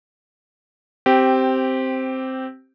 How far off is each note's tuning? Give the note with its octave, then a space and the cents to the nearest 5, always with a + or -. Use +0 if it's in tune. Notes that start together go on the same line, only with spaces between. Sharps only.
C4 +0 G4 -10